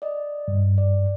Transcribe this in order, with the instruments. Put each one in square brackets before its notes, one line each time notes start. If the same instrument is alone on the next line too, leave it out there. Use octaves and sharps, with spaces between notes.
[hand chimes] D5 D#5
[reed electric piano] G2
[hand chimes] D5